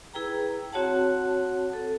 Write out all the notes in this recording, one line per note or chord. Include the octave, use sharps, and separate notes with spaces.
E4 G#4 B4 G5 A#5
C4 F#4 C#5 F#5 A5
A4